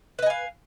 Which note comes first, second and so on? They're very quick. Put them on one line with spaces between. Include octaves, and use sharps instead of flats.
B4 D#5 G#5 F5